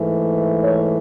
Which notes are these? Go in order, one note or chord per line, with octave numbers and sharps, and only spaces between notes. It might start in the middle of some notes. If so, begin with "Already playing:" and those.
Already playing: G#2 E3 A3
C#5